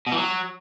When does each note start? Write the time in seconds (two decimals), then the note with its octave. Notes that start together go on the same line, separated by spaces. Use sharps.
0.07 B2
0.12 E3
0.18 F#3